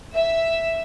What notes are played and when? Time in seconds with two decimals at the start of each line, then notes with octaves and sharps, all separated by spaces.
0.13 E5